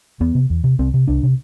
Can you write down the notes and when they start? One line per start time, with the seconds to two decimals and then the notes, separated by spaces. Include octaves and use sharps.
0.20 E2 B3
0.35 C3
0.50 E2
0.64 C3
0.79 C2 C4
0.94 C3
1.08 C2 D4
1.23 C3